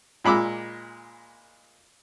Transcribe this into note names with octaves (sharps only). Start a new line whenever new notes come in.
A#2 G#3 B5 D6 E6